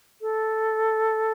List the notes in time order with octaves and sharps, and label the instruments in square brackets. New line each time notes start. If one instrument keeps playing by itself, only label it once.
[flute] A4